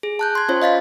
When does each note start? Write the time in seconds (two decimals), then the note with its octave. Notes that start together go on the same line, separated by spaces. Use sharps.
0.03 G#4
0.19 A5 F#6 G6
0.35 C6 G#6
0.49 C#4 F4 C5 C#5
0.62 D#5 F5 A6 B6